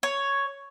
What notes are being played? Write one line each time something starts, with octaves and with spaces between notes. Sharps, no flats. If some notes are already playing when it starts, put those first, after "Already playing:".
C#5